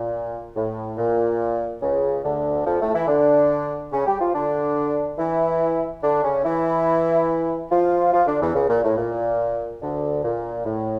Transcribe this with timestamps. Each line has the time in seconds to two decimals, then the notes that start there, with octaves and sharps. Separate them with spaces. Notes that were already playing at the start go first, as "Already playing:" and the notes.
Already playing: A#2
0.56 A2
0.98 A#2
1.81 C#2 C#3
2.24 D2 D3
2.65 F2 F3
2.79 A2 A3
2.94 E3 E4
3.07 D3 D4
3.92 C#3 C#4
4.06 G3 G4
4.20 F3 F4
4.34 D3 D4
5.18 E3 E4
6.02 D3 D4
6.23 C#3 C#4
6.44 E3 E4
7.70 F3 F4
8.12 F3 F4
8.26 D3 D4
8.41 E2 E3
8.54 C#2 C#3
8.68 A#2
8.83 A2
8.97 A#2
9.81 D2 D3
10.23 A#2
10.65 A2